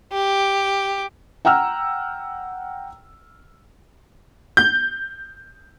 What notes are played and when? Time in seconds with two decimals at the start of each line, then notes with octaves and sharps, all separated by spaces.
0.13 G4
1.45 F#5 G5 A#5 E6 F6
4.57 G6